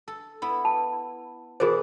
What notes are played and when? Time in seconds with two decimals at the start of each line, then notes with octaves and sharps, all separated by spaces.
0.08 A4
0.42 B3 E4
0.65 A5
1.60 B2 E3 G#4 A#4 C5 D5